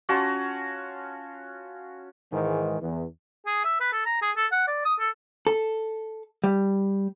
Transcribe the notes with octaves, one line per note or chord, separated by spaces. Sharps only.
C#4 F4 F#4 A5
G#2 D#3 E3 G#3
E2
G#4
E5
B4
A4
A#5
G#4
A4
F#5
D5
D#6
A4
A4
G3